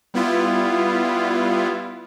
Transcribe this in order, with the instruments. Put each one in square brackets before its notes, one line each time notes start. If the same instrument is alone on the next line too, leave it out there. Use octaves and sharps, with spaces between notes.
[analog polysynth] G3 B3 E4 F4